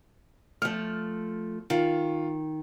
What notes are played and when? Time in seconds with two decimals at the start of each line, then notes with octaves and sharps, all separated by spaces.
0.62 F3 A3 F6
1.70 D#3 F4